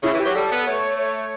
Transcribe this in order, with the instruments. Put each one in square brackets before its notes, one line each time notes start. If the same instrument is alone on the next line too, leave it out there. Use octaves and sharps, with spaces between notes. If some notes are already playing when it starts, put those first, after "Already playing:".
[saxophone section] C#3 [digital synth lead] E4
[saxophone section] E3
[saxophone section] F#3 [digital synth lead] G4
[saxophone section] G3 [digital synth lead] A4
[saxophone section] B3
[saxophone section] A3 [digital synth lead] C#5
[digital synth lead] C#5